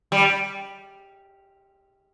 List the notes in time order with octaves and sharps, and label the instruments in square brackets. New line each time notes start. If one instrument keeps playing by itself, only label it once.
[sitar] G3